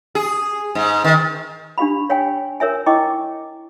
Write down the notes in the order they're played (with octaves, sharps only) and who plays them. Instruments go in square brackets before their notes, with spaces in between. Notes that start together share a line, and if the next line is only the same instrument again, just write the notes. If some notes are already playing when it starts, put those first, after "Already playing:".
[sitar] G#4
G#2
D#3
[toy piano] D4 G4 F5 B5
C#5 F5 G5 G#5
A#4 C#5 E5 G#5
E4 D#5 G5 C#6 D6